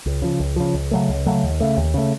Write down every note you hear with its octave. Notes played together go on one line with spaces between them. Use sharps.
C#2
C#3 F3
C#2
C#3 F3
C#2
C#3 F#3 A3
C#2
C#3 F#3 A3
D#2
C#3 A3
D#2
C#3 A3